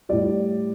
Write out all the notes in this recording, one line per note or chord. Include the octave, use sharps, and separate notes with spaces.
A2 G3 D5